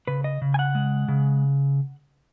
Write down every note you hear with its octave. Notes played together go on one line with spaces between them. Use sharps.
C#3 B4
D#5
C#3
G#5
F#5
G#3
C#3